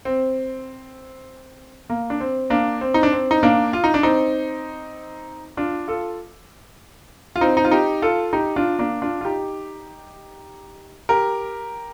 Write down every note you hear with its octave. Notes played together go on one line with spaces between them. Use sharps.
C4
A#3
D4
C4
A#3 D4
C4
D#4
D4
C4
D#4
A#3 D4
F4
D#4
D4
C4 D#4
D4 F4
F4 A4
F4
C4 D#4
D#4
F4
D#4 G4
F4 A4
D#4 G4
D4 F4
A#3 D4
D4 F4
F4
D#4 G4
G4 A#4